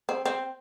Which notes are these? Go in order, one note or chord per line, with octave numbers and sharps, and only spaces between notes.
C4
C4